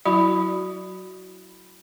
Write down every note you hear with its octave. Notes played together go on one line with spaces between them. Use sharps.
F#3 E4 F#4 D5 B5